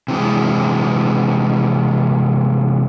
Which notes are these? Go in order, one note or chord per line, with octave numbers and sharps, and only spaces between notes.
C3 E3 G#3